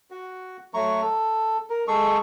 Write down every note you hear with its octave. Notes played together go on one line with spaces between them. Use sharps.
F#4
F#3 A3 A#5 C#6
A4
A#4
G#3 G#4 A4 C#6